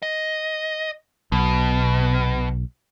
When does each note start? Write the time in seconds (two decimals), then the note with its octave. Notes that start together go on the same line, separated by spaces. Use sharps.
0.03 D#5
1.32 B1 B2